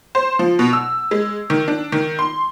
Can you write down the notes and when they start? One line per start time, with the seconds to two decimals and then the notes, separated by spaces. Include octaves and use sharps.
0.15 C5
0.39 F3
0.59 B2
0.73 E6
1.11 G#3
1.50 D#3
1.68 D4
1.92 D#3
2.19 C6